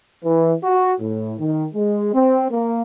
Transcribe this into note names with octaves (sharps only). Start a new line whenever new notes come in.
E3
F#4
A2
D#3
G#3
C4
A#3